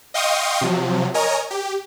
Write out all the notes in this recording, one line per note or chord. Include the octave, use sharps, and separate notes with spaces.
D#5 F5 G5 C6 C#6 D#6
C3 F3 F#3
A#4 C#5 D#5 G#5 A#5
G4